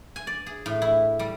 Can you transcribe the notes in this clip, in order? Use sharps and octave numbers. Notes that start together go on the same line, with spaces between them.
G#5
D5
G#4
A2
E4
G3